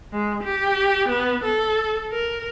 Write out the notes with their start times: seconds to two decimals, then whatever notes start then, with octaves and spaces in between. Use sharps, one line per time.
0.13 G#3
0.43 G4
1.08 B3
1.44 A4
2.12 A#4